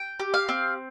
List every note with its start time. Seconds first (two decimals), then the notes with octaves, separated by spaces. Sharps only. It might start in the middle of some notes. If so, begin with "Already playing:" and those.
Already playing: G5
0.20 G4
0.34 F5
0.49 C4